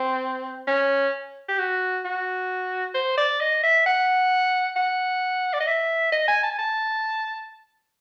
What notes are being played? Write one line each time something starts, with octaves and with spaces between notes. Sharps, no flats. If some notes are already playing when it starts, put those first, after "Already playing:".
Already playing: C4
C#4
G4
F#4
F#4
C5
D5
D#5
E5
F#5
F#5
D5
D#5
E5
D#5
G#5
A5
G#5
A5